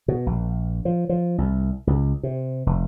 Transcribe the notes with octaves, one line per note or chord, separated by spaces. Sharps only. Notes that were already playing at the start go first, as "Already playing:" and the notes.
B2
A#1
F3
F3
C2
C#2
C3
F1